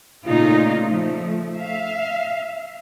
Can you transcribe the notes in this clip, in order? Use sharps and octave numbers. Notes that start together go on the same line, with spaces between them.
A#2 C#3 A3 D#4 F4
F3 A3
E5 F5